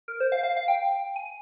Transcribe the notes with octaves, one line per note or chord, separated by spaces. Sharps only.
A#4
C5
F5
F5
F5
G5
G#5